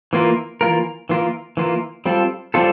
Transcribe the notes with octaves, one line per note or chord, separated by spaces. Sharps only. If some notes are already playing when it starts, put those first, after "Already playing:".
E3 A#3 F4 A#4
E3 A#3 F4 A#4
E3 A#3 F4 A#4
E3 A#3 F4 A#4
G3 C4 F4 A4
G3 C4 F4 A4